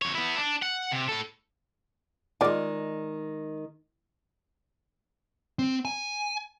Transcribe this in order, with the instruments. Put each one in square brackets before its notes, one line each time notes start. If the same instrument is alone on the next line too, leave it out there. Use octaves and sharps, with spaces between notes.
[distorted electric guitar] F2 C#5
B3 E4
D4
F#5
C3
A2 A4
[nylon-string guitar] D#3 G#3 [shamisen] F4 D5
[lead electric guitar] C4
G#5